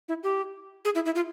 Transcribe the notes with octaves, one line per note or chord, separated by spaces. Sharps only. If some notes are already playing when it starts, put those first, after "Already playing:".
E4
G4
G#4
E4
E4
F4